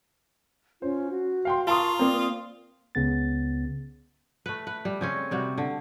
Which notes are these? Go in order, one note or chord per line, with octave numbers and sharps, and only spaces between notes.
C#4 F4 C5 C#5
F#4
F5 G5 C6
F4 A#4 A5 A#5 C6 C#6 D#6
A#3 C4 D5 D#6
C#2 C#3 B3 A6
A3 B4
B4
G3
C#3 C4 C#4
C3 G3 F#4
D3